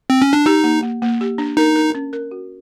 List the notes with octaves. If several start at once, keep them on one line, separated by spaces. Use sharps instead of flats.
C4
C#4
D4
D#4 G4
A#3
A#3
A#3
G4
D4
D#4 A#4
A#4
C#4
A#4
F#4